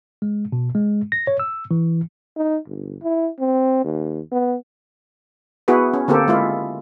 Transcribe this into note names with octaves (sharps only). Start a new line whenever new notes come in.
G#3
B2
G#3
A#6
C#5
E6
E3
D#4
G1
E4
C4
D#2
B3
B3 E4 F#4 G#4 B4
C#4
D3 A#3 C4 G4 A4
G#3 E4 F4